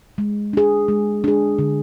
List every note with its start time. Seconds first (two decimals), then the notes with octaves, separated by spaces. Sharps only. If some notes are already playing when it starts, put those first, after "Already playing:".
0.18 G#3
0.53 D4 G#4
0.88 G#3
1.24 D4 G#4
1.59 D3